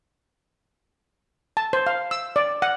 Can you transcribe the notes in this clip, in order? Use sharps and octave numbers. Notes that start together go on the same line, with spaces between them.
A5
C5
F5
E6
D5
F#5